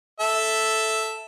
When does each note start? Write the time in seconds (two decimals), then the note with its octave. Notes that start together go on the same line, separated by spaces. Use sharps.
0.20 A4 E5